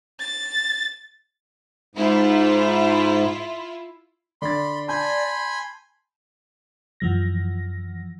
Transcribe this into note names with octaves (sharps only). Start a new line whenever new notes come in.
A6
G#2 E4 F4
D3 D5 B5 C6 A6
G#5 A5 B5 C6 G6
F#2 E3 F3 A#6